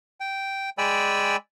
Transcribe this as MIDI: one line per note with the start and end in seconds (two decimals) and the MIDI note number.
0.20 0.70 79
0.78 1.36 56
0.78 1.36 74
0.78 1.36 79
0.78 1.36 80
0.78 1.36 83
0.78 1.36 88